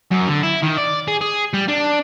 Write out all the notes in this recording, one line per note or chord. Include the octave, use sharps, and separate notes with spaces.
F#2
D3
E4
D#3
D5
G#4
G#4
G3
D4